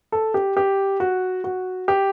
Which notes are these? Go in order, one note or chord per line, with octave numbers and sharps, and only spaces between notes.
A4
G4
G4
F#4
F#4
G4